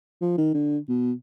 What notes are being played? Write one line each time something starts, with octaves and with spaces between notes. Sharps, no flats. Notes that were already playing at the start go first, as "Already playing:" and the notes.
F3
D#3
D3
B2